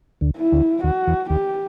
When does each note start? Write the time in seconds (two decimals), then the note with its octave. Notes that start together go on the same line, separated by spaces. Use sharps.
0.21 D2 D3
0.37 E4
0.52 D2 D3
0.84 D#2 D#3 F#4
1.07 E2 E3
1.30 D#2 D#3 G4